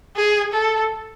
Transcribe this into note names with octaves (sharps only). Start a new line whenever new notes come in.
G#4
A4